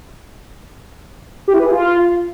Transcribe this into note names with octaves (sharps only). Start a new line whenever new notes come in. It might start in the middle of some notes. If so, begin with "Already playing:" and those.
G4
E4
B4
G#4
F4